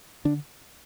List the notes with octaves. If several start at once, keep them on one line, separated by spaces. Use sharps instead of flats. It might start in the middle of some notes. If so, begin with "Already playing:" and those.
D3 D4